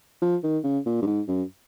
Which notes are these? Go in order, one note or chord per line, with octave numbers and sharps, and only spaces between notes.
F3
D#3
C#3
A#2
G2
G#2
F#2